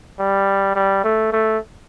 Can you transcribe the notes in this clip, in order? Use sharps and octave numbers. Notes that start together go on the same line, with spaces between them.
G3
G3
A3
A3